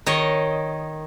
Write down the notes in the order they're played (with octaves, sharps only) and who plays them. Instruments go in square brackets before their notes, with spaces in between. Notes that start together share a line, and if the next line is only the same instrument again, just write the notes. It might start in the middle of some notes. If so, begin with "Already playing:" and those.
[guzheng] D#3 C#5 D#5